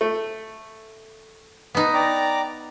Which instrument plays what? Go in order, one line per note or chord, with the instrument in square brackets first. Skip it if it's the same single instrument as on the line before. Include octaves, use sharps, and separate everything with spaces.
[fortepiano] A3
[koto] B3 D#4 [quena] B4
[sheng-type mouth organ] D5 A#5 D6 [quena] G5